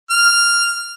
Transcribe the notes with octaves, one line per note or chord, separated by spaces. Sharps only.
F6